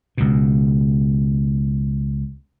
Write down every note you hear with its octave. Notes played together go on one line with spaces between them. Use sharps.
C#2 B2